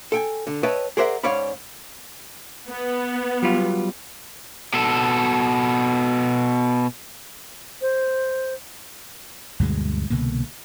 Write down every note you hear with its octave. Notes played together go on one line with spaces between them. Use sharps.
A4 G5 G#5
D3
B4 C#5 D#5 E5 G5 A5
G#4 A#4 C5 D5 E5 F#5
G#2 C#4 C#5 D5 F5 B5
B3
F#3 G3 F4
B2 A4
C5
D2 G2 B2 G#3
C2 B2 D3 A#3